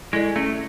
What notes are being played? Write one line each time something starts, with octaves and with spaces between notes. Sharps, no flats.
G#3 E4 A4 D5
A3 C#4